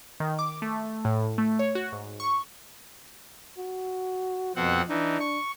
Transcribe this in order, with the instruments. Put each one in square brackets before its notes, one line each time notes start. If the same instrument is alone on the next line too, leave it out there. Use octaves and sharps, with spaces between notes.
[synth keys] D#3
D6
A3
A2
A3
C#5
F#4
G#2
C#6
[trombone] F#4
[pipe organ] F2 C4 F#5 [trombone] B2
[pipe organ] E3 D#4 [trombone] D4
[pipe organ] C#6